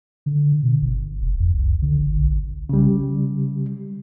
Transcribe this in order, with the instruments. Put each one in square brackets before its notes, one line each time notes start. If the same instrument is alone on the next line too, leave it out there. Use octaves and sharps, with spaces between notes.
[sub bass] D3
B2
G1
F1
F2
C2
D3
G1
B1
[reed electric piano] C#3 G3